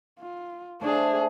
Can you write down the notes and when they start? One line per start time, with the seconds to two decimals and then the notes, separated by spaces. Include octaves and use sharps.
0.19 F4
0.81 A3 D4 G#4 C5 F5